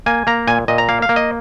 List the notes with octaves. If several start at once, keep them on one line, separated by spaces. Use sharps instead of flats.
A#3 G#5
A#3 A#5
A#2 G#5
A#2 D#5
A#5
A#3 F5
F5
A#3
D#5